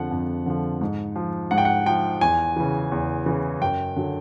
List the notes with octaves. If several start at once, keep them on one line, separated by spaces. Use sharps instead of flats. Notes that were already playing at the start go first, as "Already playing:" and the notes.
Already playing: F2 D3 F3 F#5
F2
D3 F3
G#2
F3
G#2 F#5
G5
F#5
F3 G5
E2 G#5
C#3 E3
E2
C#3 E3
F#2 G5
D3 F#3